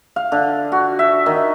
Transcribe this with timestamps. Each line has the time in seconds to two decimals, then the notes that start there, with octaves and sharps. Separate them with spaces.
0.16 F5
0.32 D3
0.72 F#4
0.99 E5
1.26 D#3